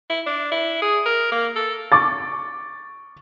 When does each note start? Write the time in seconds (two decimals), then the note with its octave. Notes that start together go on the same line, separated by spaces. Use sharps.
0.09 E4
0.26 D4
0.51 E4
0.82 G#4
1.06 A#4
1.31 A#3
1.56 A4
1.92 C#6 D6 A6